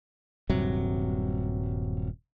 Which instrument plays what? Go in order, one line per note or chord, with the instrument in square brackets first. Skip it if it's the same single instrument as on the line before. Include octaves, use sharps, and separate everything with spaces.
[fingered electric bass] D#1 G2 C3 F#3